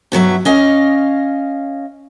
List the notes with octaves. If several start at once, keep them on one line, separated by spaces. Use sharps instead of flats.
G2 B2 F#3 E5
C#4 D#5 F5